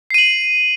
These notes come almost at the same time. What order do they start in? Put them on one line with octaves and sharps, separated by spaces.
C7 D#7 F#7